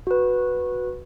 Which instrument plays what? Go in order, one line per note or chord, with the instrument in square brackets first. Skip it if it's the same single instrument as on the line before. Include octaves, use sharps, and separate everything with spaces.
[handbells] F#4 B4